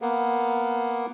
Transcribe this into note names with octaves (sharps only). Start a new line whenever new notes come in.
A#3 B3